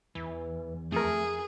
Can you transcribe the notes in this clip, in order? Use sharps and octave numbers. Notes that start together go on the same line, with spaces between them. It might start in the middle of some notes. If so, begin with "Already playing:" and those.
E2 E3
F2 A3 G#4 A#4